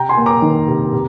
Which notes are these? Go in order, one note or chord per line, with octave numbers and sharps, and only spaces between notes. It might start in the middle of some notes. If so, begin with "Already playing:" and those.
Already playing: C3 G5 A#5
G#5 C6
A#3
A#5 D6
D#3
C3
C3